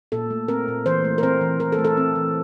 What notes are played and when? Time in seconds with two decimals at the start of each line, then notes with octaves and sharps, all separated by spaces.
0.12 A#2 A4
0.30 A3
0.48 C4 A#4
0.68 A#2
0.86 E3 C5
1.05 A3
1.18 A#4
1.23 C4 C5
1.41 E3
1.60 E3 A#4
1.72 A4
1.79 A3
1.85 A4
1.97 C4
2.15 E3